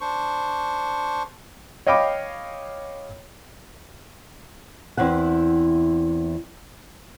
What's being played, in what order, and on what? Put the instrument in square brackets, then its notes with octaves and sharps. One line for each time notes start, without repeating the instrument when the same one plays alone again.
[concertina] D4 C5 C#6
[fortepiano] C#5 D#5 F5 G5 B5 D6
[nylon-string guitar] E2 C4 E4 F#5